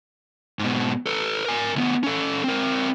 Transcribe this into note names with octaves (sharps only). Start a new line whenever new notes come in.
G#2 B2
A4 B4
A#4 G#5
D2 B3
C#4 A4
C4 A#4